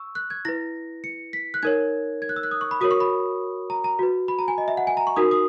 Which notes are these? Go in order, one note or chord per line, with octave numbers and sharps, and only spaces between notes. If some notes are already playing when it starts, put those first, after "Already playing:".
Already playing: C#6 E6
F#6
G#6
E4 B4 A#6
C#7
B6
F#6
D#4 A#4 C#5 G#6
G#6
F#6
E6
F#6
D#6
C#6
B5
F#4 A#4 C#5 D#6
C#6
B5
A#5
A#5
F#4 B4
B5
A#5
G#5
D#5
E5
F#5
G#5
A#5
C#6
D#4 F#4 A#4 D#6
D#6